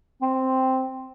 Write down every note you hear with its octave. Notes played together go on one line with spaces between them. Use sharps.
C4